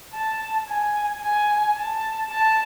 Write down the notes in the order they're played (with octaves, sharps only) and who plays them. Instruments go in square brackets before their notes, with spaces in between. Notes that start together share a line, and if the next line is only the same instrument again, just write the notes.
[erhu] A5
G#5
G#5
A5
A5